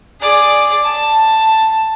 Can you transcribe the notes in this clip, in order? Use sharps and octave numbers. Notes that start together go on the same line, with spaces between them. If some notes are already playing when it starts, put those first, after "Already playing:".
G#4 D5
A5